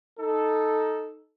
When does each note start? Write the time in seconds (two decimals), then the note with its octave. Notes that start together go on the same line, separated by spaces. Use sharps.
0.19 D#4 A4